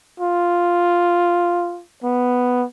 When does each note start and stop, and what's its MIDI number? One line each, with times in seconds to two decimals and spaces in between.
0.20 1.82 65
2.04 2.65 59